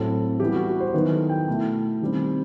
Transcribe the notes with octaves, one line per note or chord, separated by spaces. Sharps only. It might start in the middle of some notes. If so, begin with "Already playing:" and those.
Already playing: A2 F#3 C4 A4
E3 G3 B3 G4
F#4
F#4
C5
D#3 F#3 B3 E4 B4
A4
G5
B2 A3 E4
D#3 G3 C4